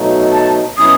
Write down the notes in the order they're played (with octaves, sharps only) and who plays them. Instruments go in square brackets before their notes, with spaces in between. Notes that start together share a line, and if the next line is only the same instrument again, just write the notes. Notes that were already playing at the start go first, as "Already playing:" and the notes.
Already playing: [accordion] B2 F#3 A3 D#4
[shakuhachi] A5
[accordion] B2 F#3 C#4 E4 [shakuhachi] D#6